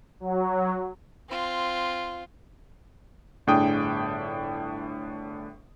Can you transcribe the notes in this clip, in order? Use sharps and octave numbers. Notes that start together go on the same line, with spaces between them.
F#3
C4 F4
G1 A2 D4 G#4 G5 D#6